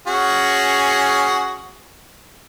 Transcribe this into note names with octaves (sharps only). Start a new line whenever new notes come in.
C#4 F#4 G#4